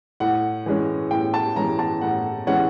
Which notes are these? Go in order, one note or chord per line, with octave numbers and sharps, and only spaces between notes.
A2 F#5
E3 G#3 C#4
A2 G5
A5
E3 G#3 C#4 A#5
A5
A2 F#5
E3 G#3 C#4 F#5